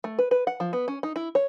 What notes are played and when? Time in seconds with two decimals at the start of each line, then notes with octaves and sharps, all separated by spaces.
0.04 A3
0.19 B4
0.31 B4
0.47 F#5
0.60 F3
0.73 B3
0.88 C#4
1.03 D#4
1.16 E4
1.35 C#5